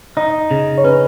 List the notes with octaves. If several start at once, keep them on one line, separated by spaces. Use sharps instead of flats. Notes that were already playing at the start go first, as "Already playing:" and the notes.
D#4 D#5
C#3
C#5
C#4 B4